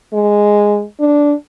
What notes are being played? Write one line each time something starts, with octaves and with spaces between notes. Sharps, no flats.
G#3
D4